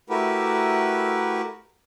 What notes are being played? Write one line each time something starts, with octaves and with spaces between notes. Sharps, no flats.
A3 E4 F#4 G4 A#4 B4